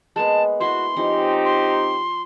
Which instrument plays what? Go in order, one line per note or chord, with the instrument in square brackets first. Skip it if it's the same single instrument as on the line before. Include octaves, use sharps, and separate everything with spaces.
[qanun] G#3 A#3 B3 [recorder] A5
[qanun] E4 E5 [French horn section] F#4 [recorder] C6
[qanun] F3 C#4 D#5 [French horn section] C4 D#4 G4
[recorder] C6